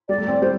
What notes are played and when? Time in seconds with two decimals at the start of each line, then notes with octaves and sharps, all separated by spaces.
0.09 G3 D5
0.18 A3
0.28 C4
0.41 G3 C5